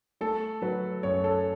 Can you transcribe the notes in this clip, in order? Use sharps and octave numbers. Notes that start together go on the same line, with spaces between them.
A3 A4
F#3 B4
F#2 C#5
A4